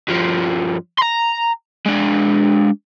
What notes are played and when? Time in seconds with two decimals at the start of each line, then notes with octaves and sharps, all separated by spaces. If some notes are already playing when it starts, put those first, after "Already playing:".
0.08 G2 F3
0.98 A#5 C6
1.86 G#3 D4